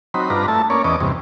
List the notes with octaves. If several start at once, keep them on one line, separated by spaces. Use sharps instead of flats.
F#3 C4 D#4 B5
G2 D4 F4 B4 A#5
A3 E4 A5
A#3 C#4 C#5 D5
E2 B3 C#4 D#5 D6
E2 G2 C3